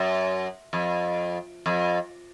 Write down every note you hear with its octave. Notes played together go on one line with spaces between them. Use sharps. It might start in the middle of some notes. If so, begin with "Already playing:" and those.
Already playing: F#2
F2
F2